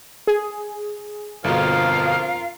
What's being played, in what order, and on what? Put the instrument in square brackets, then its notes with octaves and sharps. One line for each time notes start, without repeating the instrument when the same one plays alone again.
[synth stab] G#4
[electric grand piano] G1 B2 [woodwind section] F2 F5 [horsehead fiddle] F4 A#4